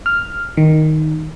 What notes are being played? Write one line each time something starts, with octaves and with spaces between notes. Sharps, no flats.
F6
D#3